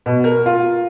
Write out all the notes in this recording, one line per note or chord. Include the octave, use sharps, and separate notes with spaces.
B2
A#4
F4